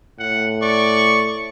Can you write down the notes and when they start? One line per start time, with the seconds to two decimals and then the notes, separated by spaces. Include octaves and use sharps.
0.19 A2 F#5
0.62 D5 C#6